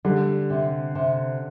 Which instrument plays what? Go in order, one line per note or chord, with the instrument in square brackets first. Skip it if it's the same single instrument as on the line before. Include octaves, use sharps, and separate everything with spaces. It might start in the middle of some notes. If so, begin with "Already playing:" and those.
[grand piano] D3 [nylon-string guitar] G3
[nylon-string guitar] C3
C3